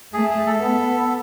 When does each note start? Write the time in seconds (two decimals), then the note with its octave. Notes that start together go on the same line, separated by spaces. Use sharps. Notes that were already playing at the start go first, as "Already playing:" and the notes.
0.13 A3 G#4
0.30 G#4
0.46 A4
0.62 B3